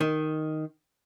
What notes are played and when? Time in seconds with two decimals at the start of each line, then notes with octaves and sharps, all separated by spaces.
0.01 D#3